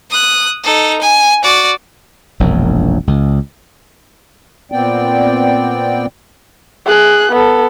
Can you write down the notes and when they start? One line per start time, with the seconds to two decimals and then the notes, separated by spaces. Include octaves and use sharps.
0.10 D#6 F#6
0.64 D#4 A4
1.01 G#5
1.43 F#4 D5
2.40 E1 A#1 F#2
3.07 C#2
4.72 A#2 B3 C4 D5 G5
6.86 G#4 F#6
7.32 B3 A4